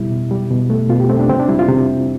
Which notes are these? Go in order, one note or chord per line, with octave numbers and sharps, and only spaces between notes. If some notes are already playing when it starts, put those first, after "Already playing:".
Already playing: B2 G3 E4
B2
G3
B2
A3
B2 F4
G4
A3 C4
D4
C3 C4
D4
G3 E4
F4
C3